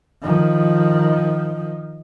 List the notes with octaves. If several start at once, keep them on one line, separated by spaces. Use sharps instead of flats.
D#3 F3